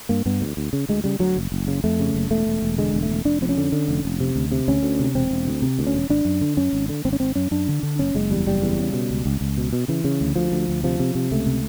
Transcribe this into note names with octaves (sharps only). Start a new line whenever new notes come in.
G2 A#3
G2 B3
D2
D2
C#3
D2 G#3
C#3 G3
D2 F#3
F#1
F#1
C#3
F2 A3
C#3
F#1
E1 A3
E1
E1
D3 G#3
E1
A3
E1
F1 D4
F2 C4
C#4
D3
D3
F1
F1
C3
D2
C3
D2 C#4
D2
C3
E1 C4
E1
D2
C3
D2
C#4
E1
G#1 D4
F#2
D3
F#2 C#4
G#1
D3
G#1 C4
C#4
G#1 C4
F#2 C#4
F#2 D4
D3
D3
F#1 C#4
F#1 G#3
E2 G3
F#1 G3
E2
C#3
B2
C#2
C#2
C#2
B2
B2
C#3 E3
C#3
D2
D2 F3
D2
D2
C3 F3
C3
C3
C#2 A3
C3